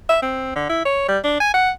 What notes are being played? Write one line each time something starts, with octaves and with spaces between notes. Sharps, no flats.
E5
C4
D3
E4
C#5
G3
D4
G#5
F#5